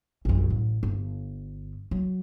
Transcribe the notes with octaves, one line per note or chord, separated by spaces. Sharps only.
A#1 F#2
A1
G1
F#3